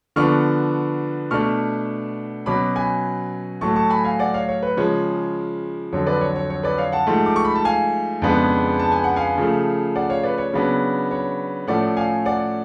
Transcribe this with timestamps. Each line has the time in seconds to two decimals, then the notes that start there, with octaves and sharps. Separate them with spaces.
0.16 D3 F3 B3 D4 C#6 F6
1.31 B2 A3 D4 C#6 F6
2.46 B2 F#3 C#4 B5 D6
2.76 G#5 B5
3.61 A2 F#3 A3 A5 C#6
3.76 A5 C#6
3.90 G#5 B5
4.04 F5 G#5
4.19 D5 F#5
4.34 C#5 F5
4.49 C#5
4.63 B4
4.77 C#3 F3 G#3 C#5
5.93 F2 D3 F#3 C#5
6.07 B4 D5
6.21 C#5
6.36 C#5
6.50 C#5
6.63 B4 D5
6.78 C#5 F5
6.92 F#5 A5
7.07 G#2 F3 A3
7.26 D6
7.36 C#6
7.45 B5
7.55 A5
7.65 F5 G#5
8.22 F2 C#3 G#3 B3 D4
8.79 A5
8.92 G#5
9.04 F#5
9.16 F5 G#5
9.38 C#3 F3 A3
9.96 D5 F#5
10.09 C#5 F5
10.23 B4 D5
10.38 C#5
10.53 C#3 F#3 B3 D4
11.11 C#5
11.67 A2 F3 A3 C#4 D5 F#5
11.97 F5 G#5
12.25 D5 F#5